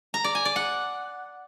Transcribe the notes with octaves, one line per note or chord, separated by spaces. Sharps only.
A#5
D5
G#5
D5
F#5